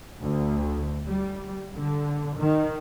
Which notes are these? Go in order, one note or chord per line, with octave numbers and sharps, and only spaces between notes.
D2
G3
D3
D#3